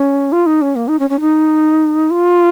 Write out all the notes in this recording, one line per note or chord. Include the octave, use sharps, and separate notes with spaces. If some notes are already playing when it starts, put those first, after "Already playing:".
Already playing: C#4
F4
D#4
C#4
A#3
D#4
C#4
C#4
D#4
F4